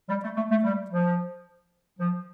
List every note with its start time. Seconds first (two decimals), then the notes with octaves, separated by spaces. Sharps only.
0.09 G3
0.24 A3
0.36 A3
0.51 A3
0.63 G3
0.91 F3
1.99 F3